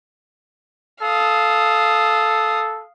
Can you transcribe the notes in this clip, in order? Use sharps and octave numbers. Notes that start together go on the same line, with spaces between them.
A4 F5 D#6